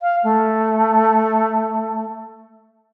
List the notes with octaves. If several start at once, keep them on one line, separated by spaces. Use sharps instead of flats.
F5
A3